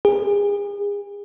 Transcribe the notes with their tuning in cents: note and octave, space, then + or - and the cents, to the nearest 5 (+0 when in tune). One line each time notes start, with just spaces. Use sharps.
G#4 -35